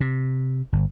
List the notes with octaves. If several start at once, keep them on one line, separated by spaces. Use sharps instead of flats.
C3
G1